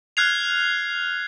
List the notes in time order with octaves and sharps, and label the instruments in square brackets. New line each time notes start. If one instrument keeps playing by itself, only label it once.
[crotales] F6 F#6 G#6 C7 F7